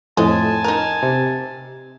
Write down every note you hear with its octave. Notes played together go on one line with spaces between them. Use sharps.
F2 A2 G#3 G#5 A5
D#4 A#4
C3